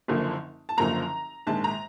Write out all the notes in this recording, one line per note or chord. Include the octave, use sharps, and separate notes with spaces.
F#1 F#2 D3 F3 A#3
A5
F#1 F#2 D3 F3 A#3 A#5
A#1 G#2 D#3 G#3 A5
A#5